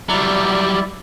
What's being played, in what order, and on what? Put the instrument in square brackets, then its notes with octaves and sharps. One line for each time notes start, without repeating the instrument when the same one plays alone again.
[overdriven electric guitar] F#3 G3 [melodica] E4 D5